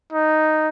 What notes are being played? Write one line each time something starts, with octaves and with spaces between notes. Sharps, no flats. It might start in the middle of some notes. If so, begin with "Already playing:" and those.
D#4